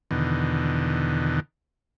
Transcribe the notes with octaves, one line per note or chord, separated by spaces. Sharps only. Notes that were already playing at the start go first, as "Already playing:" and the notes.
E2 B2 D3 D#3